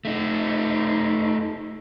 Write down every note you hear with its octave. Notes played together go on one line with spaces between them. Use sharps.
A3 D#4